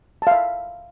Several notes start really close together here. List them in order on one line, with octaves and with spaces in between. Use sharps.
A5 F5 E5